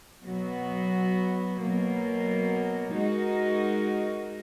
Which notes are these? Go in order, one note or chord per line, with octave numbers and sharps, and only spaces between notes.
B2 F#3 B3 F#4
B2 F#3 A#3
G#3 D#4 F#4 A#4 D#5